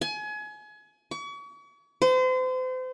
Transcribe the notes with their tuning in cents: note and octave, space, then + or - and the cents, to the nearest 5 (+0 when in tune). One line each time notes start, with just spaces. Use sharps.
G#5 +30
C#6 +40
C5 -35